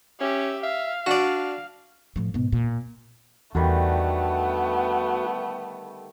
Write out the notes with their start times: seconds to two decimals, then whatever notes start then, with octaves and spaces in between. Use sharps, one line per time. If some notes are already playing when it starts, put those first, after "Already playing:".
0.21 C#4 G4 E5
0.63 E5 F5
1.06 D4 F#4 D5
2.16 A2 F3
2.34 G#2 B2
2.52 A#2
3.55 E2 D3 D#3 G3 A3 B3 F#4